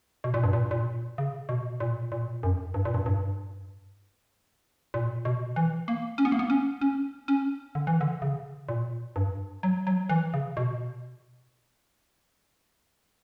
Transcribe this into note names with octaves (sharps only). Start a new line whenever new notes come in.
B2
A#2
G2
A#2
A#2
C#3
B2
A#2
A#2
F#2
G2
A#2
G2
G2
A#2
B2
E3
A#3
C#4
B3
A#3
B3
C#4
C#4
C#4
D3
E3
D3
C#3
A#2
G2
F#3
F#3
E3
C#3
B2